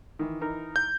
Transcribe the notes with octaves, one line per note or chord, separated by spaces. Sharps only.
D#3 E3
E3 D#4 A#4
G6